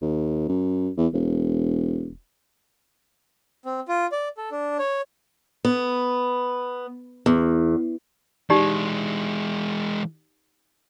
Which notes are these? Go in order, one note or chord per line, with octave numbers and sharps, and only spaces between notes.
D#2
F#2
E2
E1
C4
F4
D5
A4
D4
C#5
B3
E2
E3 G#3 D#4 G4 D5